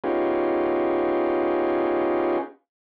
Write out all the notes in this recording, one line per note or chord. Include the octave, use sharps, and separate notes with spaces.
B3 C#4 D#4 F4 G4 G#4